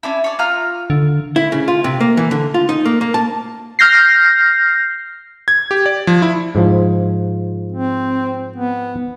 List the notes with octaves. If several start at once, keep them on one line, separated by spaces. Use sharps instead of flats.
C#4 D4 E4
C#5 D5
F4 A#5 F6
D3
E4
C#3
F4
C3
A#3
E3
D3
F4
D#4
A#3
A#3
A5
F6 G6 A#6 C7
G#6
G4
D5
F3
E4
G#2 F3
C4
B3